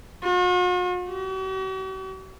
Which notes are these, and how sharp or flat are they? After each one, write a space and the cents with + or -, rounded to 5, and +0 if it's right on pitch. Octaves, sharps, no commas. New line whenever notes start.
F#4 -45
F#4 +45